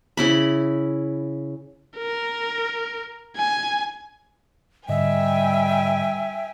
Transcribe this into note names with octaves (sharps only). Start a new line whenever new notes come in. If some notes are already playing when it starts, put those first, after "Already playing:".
C#3 E4 B5
A#4
G#5
G#2 D3 G3 D#5 E5 G5 G#5